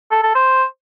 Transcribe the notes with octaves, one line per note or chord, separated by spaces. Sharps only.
A4
A4
C5